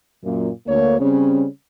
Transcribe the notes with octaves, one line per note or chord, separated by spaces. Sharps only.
F#2 A#2
D2 A#3 C#5
C#3 G3 C4 C#4